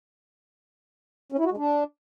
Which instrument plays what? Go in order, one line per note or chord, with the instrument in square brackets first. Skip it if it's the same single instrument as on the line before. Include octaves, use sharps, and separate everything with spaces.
[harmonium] C#4
E4
F#4
G#3
D4